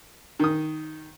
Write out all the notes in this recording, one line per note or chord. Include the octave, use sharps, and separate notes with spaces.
D#3 D#6